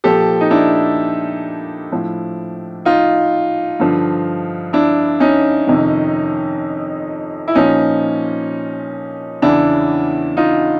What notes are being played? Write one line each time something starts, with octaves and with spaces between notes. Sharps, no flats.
A#2 F3 G4 A4
D#4
D4 E4
A2 F3
D#4 F4
G2 D3 F3
D4 E4
C#4 D#4
F2 C3 D#3
E4
A#2 F3 C#4 D#4
E2 C#3 E3 D4 E4
D#4 F4